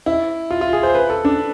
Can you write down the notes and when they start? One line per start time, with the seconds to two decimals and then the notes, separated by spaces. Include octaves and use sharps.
0.06 E4
0.51 F4
0.61 F4
0.73 G#4
0.83 C5
0.95 B4
1.10 A4
1.25 D4